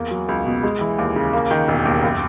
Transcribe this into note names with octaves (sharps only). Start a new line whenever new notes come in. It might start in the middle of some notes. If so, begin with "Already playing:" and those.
Already playing: E2 A#3
F#3
C#2
B2
G#3
E3
D#2
C#3
A#3
D#3
E1
D#2
F#1